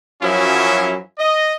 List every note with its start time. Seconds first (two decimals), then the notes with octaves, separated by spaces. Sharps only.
0.21 F#2 F3 F#3 C#4 E4
1.19 D#5